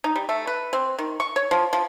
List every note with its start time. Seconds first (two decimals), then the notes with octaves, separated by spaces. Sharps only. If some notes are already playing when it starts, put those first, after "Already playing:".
0.04 D#4
0.16 G3
0.29 A3
0.47 B4
0.73 C4
0.99 D#3
1.20 C#6
1.36 C#5
1.51 F3
1.73 F3